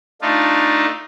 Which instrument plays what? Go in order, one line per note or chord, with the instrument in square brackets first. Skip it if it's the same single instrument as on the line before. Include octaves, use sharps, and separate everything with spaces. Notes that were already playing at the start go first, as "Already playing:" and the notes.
[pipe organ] A3 D4 D#4 F4